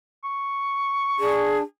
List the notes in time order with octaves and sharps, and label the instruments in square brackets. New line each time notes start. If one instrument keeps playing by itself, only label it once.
[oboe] C#6
[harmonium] D4 [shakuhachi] G#4